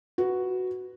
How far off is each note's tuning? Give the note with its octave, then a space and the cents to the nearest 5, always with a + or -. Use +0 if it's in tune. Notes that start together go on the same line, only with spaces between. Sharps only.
F#4 +0 B4 +0